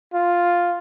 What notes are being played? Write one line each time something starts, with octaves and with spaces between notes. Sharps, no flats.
F4